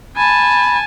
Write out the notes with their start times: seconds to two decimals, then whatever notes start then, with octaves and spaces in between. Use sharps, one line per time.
0.16 G#5 A5 B5